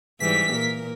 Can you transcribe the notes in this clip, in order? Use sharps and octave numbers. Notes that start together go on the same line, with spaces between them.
G#2 E3 G3 B6
A#2 A#4